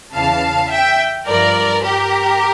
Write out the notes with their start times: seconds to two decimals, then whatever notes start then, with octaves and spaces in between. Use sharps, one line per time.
0.14 E2 C#3 E3 F5 A5
0.71 E5 G5
1.27 G2 F3 A#4 D5
1.84 G4 A#4